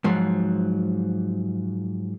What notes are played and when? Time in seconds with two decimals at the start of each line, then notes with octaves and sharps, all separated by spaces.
0.04 G#2 F3 F#3